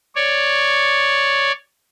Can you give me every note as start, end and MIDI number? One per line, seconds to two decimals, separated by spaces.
0.16 1.52 73
0.16 1.52 74